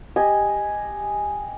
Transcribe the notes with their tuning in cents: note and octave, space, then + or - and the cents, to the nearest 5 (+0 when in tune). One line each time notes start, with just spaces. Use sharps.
G4 +10 D#5 +0 G#5 +0